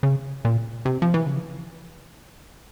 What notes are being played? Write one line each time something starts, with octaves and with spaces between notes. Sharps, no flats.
C#3
A#2
C3
F3
E3
C#3